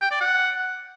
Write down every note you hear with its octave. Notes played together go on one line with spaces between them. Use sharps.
G5
D5
F#5